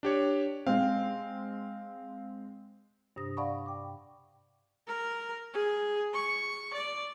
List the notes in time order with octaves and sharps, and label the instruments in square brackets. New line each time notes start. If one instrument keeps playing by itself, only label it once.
[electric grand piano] D4 G4 C#5
[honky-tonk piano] G#3 C4 [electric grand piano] F5
[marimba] G2 C3 D4 D#6 A#6
D5 F5 F#5 A5 B5 C#6
G5 D6
[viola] A#4
G#4
C#6
D5